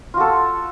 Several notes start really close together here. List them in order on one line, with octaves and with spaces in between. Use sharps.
F4 F#4 A4